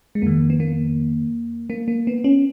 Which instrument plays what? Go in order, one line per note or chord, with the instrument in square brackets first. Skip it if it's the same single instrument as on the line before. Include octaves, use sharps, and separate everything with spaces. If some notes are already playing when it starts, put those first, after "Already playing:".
[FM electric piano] G#3
F2 D#3 A#3
B3
A#3
A#3
A#3
B3
C#4